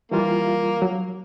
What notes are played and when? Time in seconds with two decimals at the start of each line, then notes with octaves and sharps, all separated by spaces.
0.11 E3 G3 A#3 F4
0.82 F#3